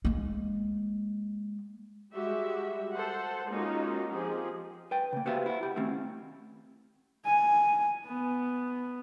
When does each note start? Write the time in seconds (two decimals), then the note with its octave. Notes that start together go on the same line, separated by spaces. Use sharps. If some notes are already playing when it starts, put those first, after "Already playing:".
0.05 G#3 A#3
2.13 G3 G#3 F#4 G4 E5
2.94 A4 C5 F#5
3.49 G#3 A#3 C#4 D#4 F4 F#4
4.12 F3 C4 G4 G#4
4.91 B4 G5
5.13 C#3 A#3
5.26 F#4 G4 B4 C5 E5 F5
5.46 E4 F#5
5.63 G4 B5
5.76 D#3 A3 C4 C#4 E4
7.25 G#5
8.06 B3